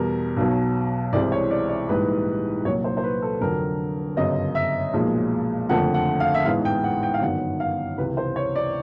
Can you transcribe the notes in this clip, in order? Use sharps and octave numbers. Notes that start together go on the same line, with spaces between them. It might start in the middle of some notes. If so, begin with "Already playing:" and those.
Already playing: E2 B2 G3 A#4
B1 B2 F#3
C2 C3 E3 G#3 C4 D5
C#5
D5
D5
A#1 G#2 E3 G3 B4
C2 A#2 F#3 C#5
C5
C5
B4
A4
F1 F2 D3 F#3 A#4
G1 F#2 C#3 D#5
E5
B1 A#2 F3 G#3
F#1 F2 D3 F3 A3 F#5
F#5
F5
E5
A1 G#2 E3 G#3 B3 F5
G5
F#5
G5
F5
G1 F#2 D#3 F#5
F5
C#2 C3 E3 B4
C5
C#5
D5